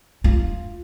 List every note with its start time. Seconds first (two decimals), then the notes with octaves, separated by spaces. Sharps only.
0.24 F4